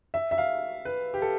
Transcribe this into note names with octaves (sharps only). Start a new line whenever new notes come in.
E5
E5
F5
B4
G4
A4